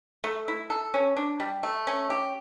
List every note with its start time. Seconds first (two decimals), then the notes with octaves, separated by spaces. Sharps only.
0.24 A3
0.48 E4
0.70 A4
0.94 C#4
1.17 D4
1.40 G3
1.63 A3
1.87 C#4
2.10 G4